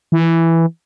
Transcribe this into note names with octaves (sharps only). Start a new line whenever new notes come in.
E3